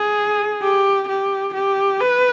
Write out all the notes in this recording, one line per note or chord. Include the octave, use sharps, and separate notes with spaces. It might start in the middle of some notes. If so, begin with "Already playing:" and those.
Already playing: G#4
G4
G4
G4
B4